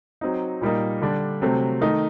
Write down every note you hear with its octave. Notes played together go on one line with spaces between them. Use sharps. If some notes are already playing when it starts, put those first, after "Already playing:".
F#3 C4 D#4
A#2 G3 A#3 D#4
D3 G3 D4
C3 F#3 A3 C4
D#3 A3 D#4